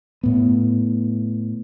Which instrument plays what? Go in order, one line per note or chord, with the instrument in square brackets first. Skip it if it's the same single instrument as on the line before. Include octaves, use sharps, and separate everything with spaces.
[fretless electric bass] A2 B3